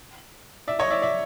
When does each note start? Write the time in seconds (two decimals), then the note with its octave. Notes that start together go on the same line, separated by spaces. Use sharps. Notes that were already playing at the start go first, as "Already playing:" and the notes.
0.68 D5 E5
0.79 C#5 D#5
0.91 D5 E5
1.02 D5 E5